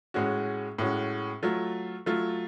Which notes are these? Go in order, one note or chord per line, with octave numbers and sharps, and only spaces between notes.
A2 G#3 C#4 F#4
A2 G#3 C#4 F#4
F#3 A3 F4
F#3 A3 F4